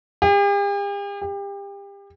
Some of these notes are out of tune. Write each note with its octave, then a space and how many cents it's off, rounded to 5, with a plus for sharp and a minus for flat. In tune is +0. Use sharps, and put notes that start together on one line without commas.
G4 +45
G4 +30